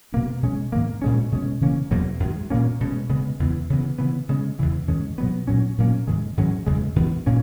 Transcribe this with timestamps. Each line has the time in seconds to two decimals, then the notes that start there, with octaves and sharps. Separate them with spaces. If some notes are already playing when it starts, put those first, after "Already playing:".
0.12 B2 A#3 C#4
0.42 B2 G#3 C#4
0.72 G#2 D#3 A#3
1.02 A#2 G#3 C#4
1.32 B2 G#3 C#4
1.61 C#3 E3 A#3 C#4
1.91 E2 B2 F#3 A#3
2.20 F#2 D#3 G#3
2.50 A#2 A#3 C#4
2.81 B2 G#3 C#4
3.10 C#3 G#3 B3
3.39 E2 C#3 E3 B3
3.70 C#3 E3 B3
3.98 C#3 E3 B3
4.29 C#3 G#3 C#4
4.59 E2 C#3 E3
4.88 F#2 D#3 G#3 C#4
5.18 B2 F#3 B3
5.47 A#2 F#3 C#4
5.78 A#2 F#3 A#3 C#4
6.07 G#2 D#3 G#3
6.37 G#2 D#3 F#3 C#4
6.67 E2 C#3 G#3
6.96 F#2 E3 B3
7.27 A#2 A#3 C#4